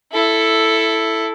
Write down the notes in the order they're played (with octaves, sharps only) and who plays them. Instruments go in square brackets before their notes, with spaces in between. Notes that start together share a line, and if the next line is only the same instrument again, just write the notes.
[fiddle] E4 A4